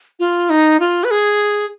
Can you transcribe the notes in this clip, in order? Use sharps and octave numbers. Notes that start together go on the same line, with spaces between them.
F4
D#4
F4
B4
G#4